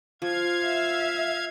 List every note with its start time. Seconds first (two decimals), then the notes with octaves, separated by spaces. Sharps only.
0.22 F3 F5 G#6
0.65 E5